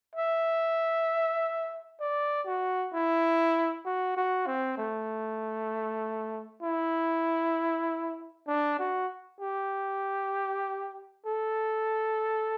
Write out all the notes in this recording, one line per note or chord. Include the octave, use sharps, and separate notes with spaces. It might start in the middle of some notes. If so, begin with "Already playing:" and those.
E5
D5
F#4
E4
F#4
F#4
C4
A3
E4
D4
F#4
G4
A4